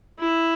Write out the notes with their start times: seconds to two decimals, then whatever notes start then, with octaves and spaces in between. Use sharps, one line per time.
0.19 E4